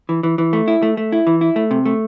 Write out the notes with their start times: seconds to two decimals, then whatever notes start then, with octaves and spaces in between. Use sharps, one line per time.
0.09 E3
0.23 E3
0.38 E3
0.53 A3
0.68 E4
0.82 A3
0.97 A3
1.12 E4
1.27 E3
1.41 E4
1.56 A3
1.71 C3
1.86 A3